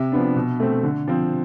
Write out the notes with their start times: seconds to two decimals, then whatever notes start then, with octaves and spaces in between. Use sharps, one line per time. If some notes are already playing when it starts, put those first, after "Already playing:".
Already playing: C3 E5
0.12 F3 B3 D4
0.36 B2
0.60 A3 C4
0.83 D3
1.08 F3 C4